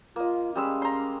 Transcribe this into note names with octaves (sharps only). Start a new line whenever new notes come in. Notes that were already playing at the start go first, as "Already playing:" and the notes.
A#3 F4 D#5
G3 G#3 C#4 E6
A#5 C6